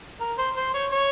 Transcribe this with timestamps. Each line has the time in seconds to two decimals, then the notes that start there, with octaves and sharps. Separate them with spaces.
0.20 A#4
0.38 C5
0.56 C5
0.74 C#5
0.91 C#5